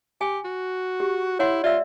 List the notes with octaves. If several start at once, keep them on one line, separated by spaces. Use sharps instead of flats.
G4 G#5
F#4
G4
E4 C#5 F#5 C6
F4 D5 E5 E6